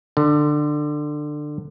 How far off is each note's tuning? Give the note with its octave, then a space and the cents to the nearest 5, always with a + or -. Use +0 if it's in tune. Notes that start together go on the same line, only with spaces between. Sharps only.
D3 +20